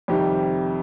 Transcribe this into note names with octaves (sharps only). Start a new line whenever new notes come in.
F2 C3 D#3 G3 G4